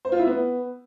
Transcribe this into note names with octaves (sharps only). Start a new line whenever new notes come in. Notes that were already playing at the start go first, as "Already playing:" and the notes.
C5
F4
E4
B3